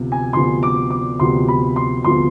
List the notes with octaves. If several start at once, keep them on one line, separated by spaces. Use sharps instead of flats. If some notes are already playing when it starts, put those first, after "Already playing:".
Already playing: D2 C3 F3 B3
G#5
D2 C3 F3 B3 C6
D6
D6
D2 C3 F3 B3 C6
B5
C6
D2 C3 F3 B3 C6